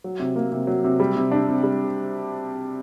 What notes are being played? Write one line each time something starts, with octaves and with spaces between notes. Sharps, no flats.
F#3
C3
A#3
C3
F#3
C3
G3
C3
D4
C3
G3